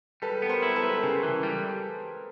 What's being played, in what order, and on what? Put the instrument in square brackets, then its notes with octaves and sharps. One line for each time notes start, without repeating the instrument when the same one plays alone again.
[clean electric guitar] G3 [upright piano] A4 B4
[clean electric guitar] B3
[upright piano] A#4 C5
[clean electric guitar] E4
[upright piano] A#4
A4 B4
[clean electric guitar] G3
[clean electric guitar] C#3 [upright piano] G#4 A#4
[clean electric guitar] E3
G3